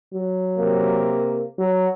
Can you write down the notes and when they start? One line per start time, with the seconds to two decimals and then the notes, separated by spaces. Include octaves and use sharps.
0.14 F#3
0.58 C3 A#3
1.58 F#3